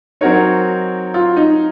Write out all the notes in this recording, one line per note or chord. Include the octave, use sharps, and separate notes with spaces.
F#3 C4 D#4 F#4 A#4 C#5
F4
D#4